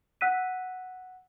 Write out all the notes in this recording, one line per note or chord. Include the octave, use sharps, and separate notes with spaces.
F#5 E6 F#6 B6 D#7